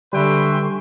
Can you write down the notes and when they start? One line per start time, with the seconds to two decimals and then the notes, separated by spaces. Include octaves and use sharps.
0.13 D3 G3 B4 E5 G5 G#5 C6 C#6